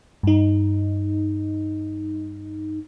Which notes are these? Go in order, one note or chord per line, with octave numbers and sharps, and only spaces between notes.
G2 D#4